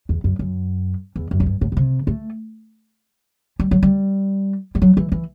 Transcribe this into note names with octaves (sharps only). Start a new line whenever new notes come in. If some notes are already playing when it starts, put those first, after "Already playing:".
E2
F#2
F#2
E2
F#2
A2
G2
A2
B2
C3
A3
G3
F#3
G3
G3
F#3
E3
E3